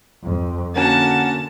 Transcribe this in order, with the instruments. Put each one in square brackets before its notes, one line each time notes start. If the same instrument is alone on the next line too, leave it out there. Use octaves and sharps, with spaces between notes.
[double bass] F2
[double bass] D3 [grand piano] A#3 C#4 F#4 [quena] F#5 [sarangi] A5